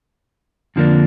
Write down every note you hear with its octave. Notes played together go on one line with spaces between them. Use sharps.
F2 D3 F3 A#3 D4